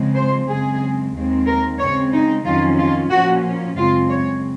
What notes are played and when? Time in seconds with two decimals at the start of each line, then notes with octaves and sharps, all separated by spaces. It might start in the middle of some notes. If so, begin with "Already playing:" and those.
Already playing: C#3 F3 G#3 C4
0.15 C5
0.47 F#2 C#3 G#3 C4 G#4
1.13 D#2 D#3 G#3 C4
1.46 A#4
1.79 C#3 G#3 C4 C#5
2.12 D#4
2.45 F2 D#3 F#3 C#4 F4
2.78 F4
3.10 A#2 F3 A#3 C#4 F#4
3.77 F#2 C#3 G#3 C4 F4
4.10 C#5